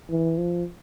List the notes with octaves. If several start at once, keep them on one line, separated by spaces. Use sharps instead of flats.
E3
F3